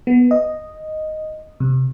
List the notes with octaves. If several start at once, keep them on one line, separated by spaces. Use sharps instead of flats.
B3
D#5
C3